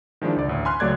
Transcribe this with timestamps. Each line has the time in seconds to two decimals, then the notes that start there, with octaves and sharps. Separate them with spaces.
0.22 D#3 F3 G#3 D4 E4
0.36 C#2 D5
0.48 A1 D2
0.65 G#5 B5 C6 F6 F#6
0.80 C#2 F#3 A3 D5 F#6 G#6